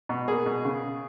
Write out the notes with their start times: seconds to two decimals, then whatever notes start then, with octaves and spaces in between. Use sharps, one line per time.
0.09 B2
0.28 A#3 G#4
0.46 B2
0.65 C#3